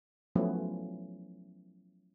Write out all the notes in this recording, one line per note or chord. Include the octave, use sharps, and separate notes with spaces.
F3 F#3 A3 B3 C#4 E4